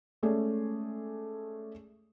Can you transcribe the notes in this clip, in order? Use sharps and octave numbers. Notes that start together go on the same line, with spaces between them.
G#3 A3 C#4 G#4 D5